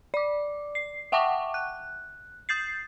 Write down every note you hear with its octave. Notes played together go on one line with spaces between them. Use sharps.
D5 D6
C7
E5 F#5 G5 A5 C#6 D6
F#6
D#6 G6 A6 C7